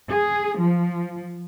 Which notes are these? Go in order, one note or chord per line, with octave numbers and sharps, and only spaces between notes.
G#4
F3